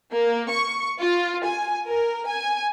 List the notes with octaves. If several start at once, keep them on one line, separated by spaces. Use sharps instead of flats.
A#3
C#6
F4
G#5
A#4
G#5